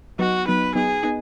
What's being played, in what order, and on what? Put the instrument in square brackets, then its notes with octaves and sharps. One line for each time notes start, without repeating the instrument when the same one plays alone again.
[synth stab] F#3 B3 D#4 [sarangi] F#4
[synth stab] F#3 B3 D#4 [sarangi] B4
[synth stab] F#3 B3 D#4 [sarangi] G#4
[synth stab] B3 D#4